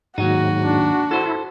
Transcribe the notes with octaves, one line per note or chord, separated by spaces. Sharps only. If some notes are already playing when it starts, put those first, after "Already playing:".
D#2 G#2 F#3 D#4 F#4
D4
E4 A4 C5